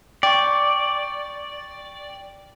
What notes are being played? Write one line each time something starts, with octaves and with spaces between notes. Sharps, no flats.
D5 G5 C#6